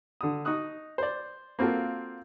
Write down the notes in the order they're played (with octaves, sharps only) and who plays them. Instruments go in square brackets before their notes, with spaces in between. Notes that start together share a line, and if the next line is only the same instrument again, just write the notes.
[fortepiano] D3 D#6
D#4 C#6 D#6 F#6
C5 D5
A#3 C4 F4 F#4 A4